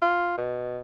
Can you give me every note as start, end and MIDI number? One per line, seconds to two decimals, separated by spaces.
0.02 0.34 65
0.38 0.80 47